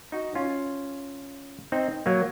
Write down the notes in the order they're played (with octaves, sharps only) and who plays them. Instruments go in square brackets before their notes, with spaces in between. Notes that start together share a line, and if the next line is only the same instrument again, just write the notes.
[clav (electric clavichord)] D#4 F#4
C#4 F4
C4 D#4
F#3 A#3